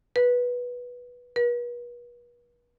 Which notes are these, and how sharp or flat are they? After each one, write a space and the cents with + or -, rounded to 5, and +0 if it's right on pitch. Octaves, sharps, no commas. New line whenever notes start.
B4 -10
B4 -40